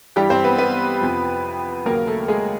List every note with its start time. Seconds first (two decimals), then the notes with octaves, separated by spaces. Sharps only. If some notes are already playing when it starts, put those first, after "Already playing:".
0.16 G2 E3 G3 G4
0.30 C4 C5
0.44 B3 B4
0.58 B3 B4
1.01 F2 C3 F3
1.85 D#2 C#3 F#3 A#3 A#4
2.07 A3 A4
2.28 G#3 G#4